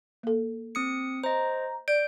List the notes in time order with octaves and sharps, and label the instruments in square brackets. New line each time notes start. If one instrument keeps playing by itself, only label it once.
[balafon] A#3 A4
[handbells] C4 D#6 C#7
[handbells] C5 D#5 [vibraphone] A#5
[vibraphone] D5 [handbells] G6